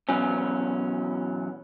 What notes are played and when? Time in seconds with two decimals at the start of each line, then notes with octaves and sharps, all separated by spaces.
0.09 E2 B2 F#3 C#4